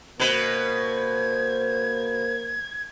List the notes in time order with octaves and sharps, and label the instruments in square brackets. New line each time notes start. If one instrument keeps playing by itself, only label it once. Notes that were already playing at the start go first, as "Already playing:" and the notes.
[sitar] B2 B4 [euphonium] A#3 [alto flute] C5 [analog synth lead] G#6